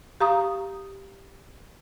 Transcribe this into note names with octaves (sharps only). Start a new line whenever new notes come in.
G4 F5 A#5 C#6 D#6